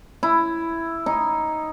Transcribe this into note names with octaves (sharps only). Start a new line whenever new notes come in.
E4
D#4